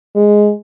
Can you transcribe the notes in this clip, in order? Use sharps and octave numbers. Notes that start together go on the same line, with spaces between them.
G#3